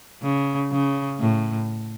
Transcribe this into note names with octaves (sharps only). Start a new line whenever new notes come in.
C#3
C#3
A2